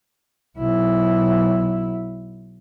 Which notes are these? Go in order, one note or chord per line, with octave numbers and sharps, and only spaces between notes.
B1 E4